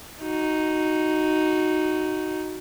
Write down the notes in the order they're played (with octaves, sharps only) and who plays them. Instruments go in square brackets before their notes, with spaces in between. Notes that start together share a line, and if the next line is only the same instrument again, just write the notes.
[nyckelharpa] D#4 F#4